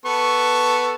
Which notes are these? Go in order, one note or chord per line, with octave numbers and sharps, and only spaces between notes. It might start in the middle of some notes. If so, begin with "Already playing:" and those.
B3 A4 C#6